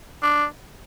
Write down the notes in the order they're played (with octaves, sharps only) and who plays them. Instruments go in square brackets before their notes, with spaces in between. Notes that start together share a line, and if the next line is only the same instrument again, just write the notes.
[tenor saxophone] D4